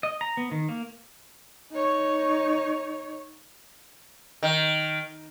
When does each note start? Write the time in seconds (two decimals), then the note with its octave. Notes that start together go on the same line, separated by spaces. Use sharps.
0.03 D#5
0.21 A#5
0.37 B3
0.51 D#3
0.69 A#3
1.72 D#4 C#5
4.43 D#3